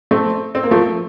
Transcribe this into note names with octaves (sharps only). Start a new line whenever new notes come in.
A3 C4
C4
A#3
F3 A3